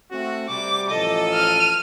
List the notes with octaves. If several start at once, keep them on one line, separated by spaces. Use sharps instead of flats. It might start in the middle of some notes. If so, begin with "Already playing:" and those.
A3 C4 F#4
C3 G3 D6
A1 F3 A4 D#5
F6 D#7